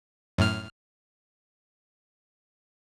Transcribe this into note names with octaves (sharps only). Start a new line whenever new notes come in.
F#2 A2 F6